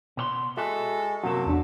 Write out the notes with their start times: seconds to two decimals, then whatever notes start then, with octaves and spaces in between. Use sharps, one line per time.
0.17 B2 C#5 C6
0.57 G#3 F#4 A4 E5
1.24 F#2 C3 F#3 A#3 F#4 A4
1.46 E2 A3 D4